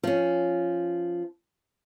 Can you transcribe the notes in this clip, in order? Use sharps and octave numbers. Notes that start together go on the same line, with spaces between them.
F3 C#4